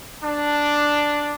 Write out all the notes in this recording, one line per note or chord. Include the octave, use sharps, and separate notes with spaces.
D4